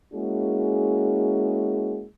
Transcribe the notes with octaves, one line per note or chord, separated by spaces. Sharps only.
G#3 A#3 C#4 E4 F#4 G#4